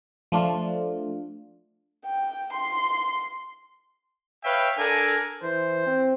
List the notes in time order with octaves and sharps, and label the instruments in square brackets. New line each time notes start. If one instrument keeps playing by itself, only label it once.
[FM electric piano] F3 A3 D4 F4
[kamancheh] G5
C6
[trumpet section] B4 C#5 E5 F5 G5
D4 A4 A#4 G#5
[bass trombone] E3 [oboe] C5
[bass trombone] C4